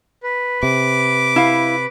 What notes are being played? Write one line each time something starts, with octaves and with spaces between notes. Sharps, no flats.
B4
C3 D6
E4 F5